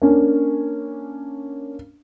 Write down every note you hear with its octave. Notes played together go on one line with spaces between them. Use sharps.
A#3 C#4 D4